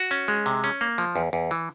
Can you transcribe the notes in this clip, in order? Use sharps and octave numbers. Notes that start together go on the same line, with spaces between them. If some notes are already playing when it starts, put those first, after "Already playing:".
Already playing: F#4
C#4
G#3
C3
C#4
A#3
F3
E2
E2
E3